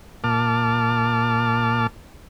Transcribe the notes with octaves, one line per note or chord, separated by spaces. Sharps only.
A#2 A5 D6 F6